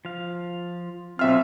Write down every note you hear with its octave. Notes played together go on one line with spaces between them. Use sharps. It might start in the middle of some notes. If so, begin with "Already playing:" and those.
F3 F5
B1 C4 F4 E5 F6